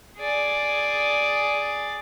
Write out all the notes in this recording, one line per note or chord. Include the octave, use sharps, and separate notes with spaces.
G#4 D5